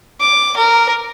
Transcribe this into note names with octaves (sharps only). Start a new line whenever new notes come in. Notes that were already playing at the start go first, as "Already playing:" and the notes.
D6
A#4